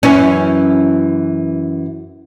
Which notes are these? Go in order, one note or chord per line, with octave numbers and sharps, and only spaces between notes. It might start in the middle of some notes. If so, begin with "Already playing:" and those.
F#2 E3 C#4